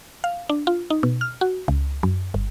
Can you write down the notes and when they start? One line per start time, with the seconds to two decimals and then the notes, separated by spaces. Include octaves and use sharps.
0.24 F5
0.49 D4
0.67 F4
0.90 D#4
1.03 B2
1.21 F6
1.41 F#4
1.68 C#2
2.03 F#2
2.34 G1